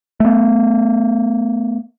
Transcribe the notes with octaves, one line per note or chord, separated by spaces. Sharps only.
A3 B3